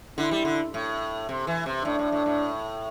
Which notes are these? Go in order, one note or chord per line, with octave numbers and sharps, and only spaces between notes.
D3 E4
G3
D3
A2
C3
E3
C3
A2 D4
A2
A2
A2